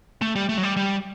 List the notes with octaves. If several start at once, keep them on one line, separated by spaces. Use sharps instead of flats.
A3
G3
A3
F#3
G3
G3